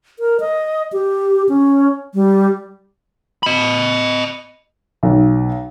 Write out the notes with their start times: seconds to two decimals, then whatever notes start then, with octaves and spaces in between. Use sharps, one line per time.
0.19 A#4
0.40 D#5
0.93 G4
1.49 C#4
2.14 G3
3.43 D#5 B5
5.03 B1